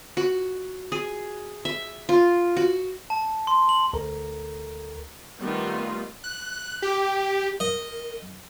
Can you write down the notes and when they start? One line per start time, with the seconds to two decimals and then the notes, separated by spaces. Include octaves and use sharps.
0.17 F#4
0.92 G#4
1.65 E5
2.09 F4
2.57 F#4
3.10 A5
3.47 C6
3.69 F#7
3.93 D2 A4 A#4 A#5
5.41 D#3 G3 A3 B3 D#4 F4
6.24 F#6
6.82 G4
7.60 A#4 D#5